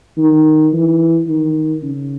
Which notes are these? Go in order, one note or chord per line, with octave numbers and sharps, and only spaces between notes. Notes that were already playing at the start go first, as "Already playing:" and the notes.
D#3
E3
D#3
C#3